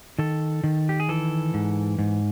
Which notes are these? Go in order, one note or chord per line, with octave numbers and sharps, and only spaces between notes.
D#3 A4
D#3
G4
G#4
E3 A4
G#2
G#2